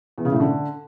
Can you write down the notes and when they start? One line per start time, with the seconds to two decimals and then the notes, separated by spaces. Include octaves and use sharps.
0.18 E2
0.25 C#3
0.33 A2
0.40 D3